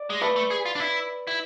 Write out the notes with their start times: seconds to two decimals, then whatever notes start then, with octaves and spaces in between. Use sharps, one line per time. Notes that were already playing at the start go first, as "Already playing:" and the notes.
Already playing: D5
0.10 G#3
0.21 A3 B4
0.36 A3
0.51 G#4
0.66 F4
0.75 D4
0.80 E4
1.27 E4